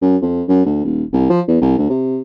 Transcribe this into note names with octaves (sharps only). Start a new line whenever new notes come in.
F#2
F2
F#2
D2
D#1
C2
F3
E2
C2
D2
C3